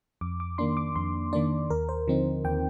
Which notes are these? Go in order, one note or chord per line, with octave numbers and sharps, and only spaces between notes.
F2 D6
D6
D#3 A#3 D4 C6
D6
F2 C6
D#3 A#3 D4 D5
D#2 A#4
C5
D3 F3 C4 D#4
D#2 G5